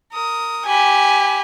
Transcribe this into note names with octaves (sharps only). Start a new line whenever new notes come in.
A#4 D#6
G4 G#5 B5